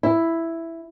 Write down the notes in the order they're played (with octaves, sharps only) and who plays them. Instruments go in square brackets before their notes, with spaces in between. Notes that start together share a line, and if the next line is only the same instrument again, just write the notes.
[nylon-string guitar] E4